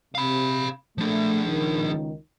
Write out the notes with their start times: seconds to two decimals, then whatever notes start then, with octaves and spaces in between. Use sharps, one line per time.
0.15 C3 F5 B5
0.98 F3 A3 D4
1.46 C#2 D#3